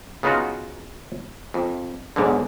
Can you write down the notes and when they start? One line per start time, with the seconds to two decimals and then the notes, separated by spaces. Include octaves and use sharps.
0.23 C#3 B3 D#4 F4 F#4
1.54 F2
2.16 B1 G#2 B2 D3